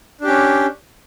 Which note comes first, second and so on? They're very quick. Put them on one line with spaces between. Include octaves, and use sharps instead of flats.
D4 G4 C#4